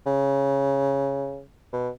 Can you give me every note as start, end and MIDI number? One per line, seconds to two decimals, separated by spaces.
0.06 1.42 49
1.73 1.89 47